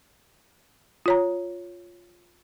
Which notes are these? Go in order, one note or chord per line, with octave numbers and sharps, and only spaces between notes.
F4 C#5 A#5